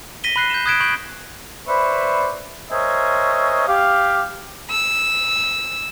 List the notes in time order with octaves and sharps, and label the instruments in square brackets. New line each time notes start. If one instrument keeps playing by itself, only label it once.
[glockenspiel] A#6 B6 D#7 G7
B5 F#6 C7
G6 E7
D#6 F#6 G#6 B6 D7 E7
B5 C#6 G6 D7 F#7
[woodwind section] B4 C5 D5 E5 B5 C#6
A#4 C5 C#5 D#5 E5 G#5
G4 F5
[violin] E6